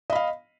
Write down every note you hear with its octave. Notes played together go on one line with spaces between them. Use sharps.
D#5 F5 B5